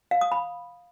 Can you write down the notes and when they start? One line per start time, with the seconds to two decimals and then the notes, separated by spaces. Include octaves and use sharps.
0.11 F5
0.21 D#6
0.32 B5